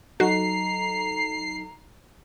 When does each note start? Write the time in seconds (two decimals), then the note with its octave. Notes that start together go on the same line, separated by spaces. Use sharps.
0.20 F#3 D#4 F#4 A4 A#5 C7